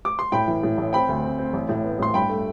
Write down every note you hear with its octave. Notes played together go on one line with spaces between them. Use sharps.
D6
C6
A2 G5 B5
E3
A2
A1
C4 G5 B5
D2
C4
C4
A1
A2
B3
A2 C6
G2 G5 B5
A3